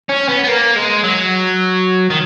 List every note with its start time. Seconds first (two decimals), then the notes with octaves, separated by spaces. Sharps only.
0.09 C#4
0.28 B3
0.44 B3
0.48 A#3
0.76 G#3
1.04 F#3
2.10 D#3